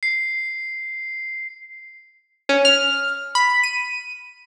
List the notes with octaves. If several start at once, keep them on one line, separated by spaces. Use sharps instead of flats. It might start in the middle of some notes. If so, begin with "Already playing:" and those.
C7
C#4
F6
B5
D#7